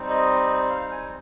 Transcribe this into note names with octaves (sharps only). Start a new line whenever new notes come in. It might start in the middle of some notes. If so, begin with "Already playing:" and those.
Already playing: G3 C4 D#4
D#5
F5
G#5